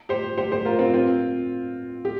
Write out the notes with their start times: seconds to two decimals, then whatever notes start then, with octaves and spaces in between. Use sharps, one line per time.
0.09 G4 C5
0.38 G4 C5
0.52 G4 C5
0.65 F4 A#4
0.79 C4 F4
0.94 C4 F4
2.05 G4